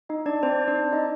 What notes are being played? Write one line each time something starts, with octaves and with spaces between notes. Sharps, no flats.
D#4 D#5
D4 D5
C4 C5
D4 D5
D#4 D#5